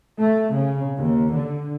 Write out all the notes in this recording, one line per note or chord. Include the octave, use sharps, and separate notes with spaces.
A3
C#3
D#2
D3